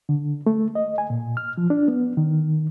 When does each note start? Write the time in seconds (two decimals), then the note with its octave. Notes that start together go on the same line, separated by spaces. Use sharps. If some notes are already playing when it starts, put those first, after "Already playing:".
0.09 D3
0.46 A3
0.75 D#5
0.98 G#5
1.10 A#2
1.37 F6
1.58 F3
1.70 D4
1.88 B3
2.17 D#3